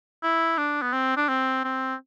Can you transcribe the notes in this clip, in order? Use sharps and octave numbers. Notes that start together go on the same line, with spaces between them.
E4
D4
B3
C4
D4
C4
C4